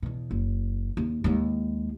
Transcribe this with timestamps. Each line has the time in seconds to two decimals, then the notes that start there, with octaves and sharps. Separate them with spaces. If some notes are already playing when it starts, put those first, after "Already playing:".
0.02 E2 B2
0.31 F#1
0.97 D#2
1.24 D#2 G#3